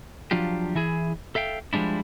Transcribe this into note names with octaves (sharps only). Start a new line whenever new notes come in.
F3 F#3 D4 F4 G4
E3 E4 G#4
A4 E5 F5 G5
F3 G3 G#3 D4 E4